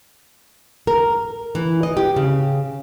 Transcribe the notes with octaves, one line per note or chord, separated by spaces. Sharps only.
A#4
E3
D#5
G4
C#3